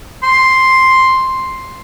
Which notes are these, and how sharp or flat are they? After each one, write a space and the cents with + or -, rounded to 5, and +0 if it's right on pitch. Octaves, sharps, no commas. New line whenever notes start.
C6 +5